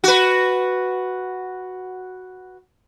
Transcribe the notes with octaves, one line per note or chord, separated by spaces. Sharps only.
F#4 B4